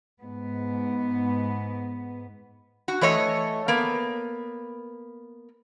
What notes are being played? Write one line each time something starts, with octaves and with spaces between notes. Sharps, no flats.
G#2 B3
F#4
E3 A3 C#5 D#5
A#3 B3